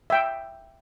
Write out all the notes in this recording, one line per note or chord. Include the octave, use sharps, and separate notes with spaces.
E5 G5